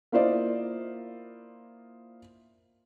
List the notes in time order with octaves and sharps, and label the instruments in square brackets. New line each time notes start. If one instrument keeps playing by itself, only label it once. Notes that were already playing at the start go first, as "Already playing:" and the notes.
[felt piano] A#3 E4 F4 C5 D5 D#5